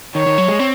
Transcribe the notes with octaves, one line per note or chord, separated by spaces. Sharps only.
D#3 C#5
D#3
F#3
G#3
C4